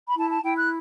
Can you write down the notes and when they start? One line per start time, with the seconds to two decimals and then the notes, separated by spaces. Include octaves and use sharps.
0.07 B5
0.17 E4 A5
0.30 A5
0.42 E4 G5
0.56 F#6